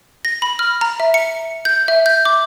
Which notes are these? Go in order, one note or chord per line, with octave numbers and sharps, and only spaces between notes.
A#6
B5
F6
A#5
E5
C#7
G6
E5
G6
D6